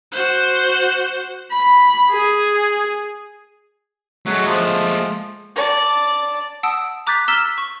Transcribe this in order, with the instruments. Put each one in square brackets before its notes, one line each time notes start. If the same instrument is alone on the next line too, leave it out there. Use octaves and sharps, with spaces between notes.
[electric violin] F#4 C5
[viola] B5
G#4
[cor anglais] F#3 [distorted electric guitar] G#3 A3
[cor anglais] F3
[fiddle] D5 A5
[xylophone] F#5 A5 D#6 E6 D7
A#5 D6 F#6 G6 A6 B6
A#5 E6 F6 B6 E7 G7
C#6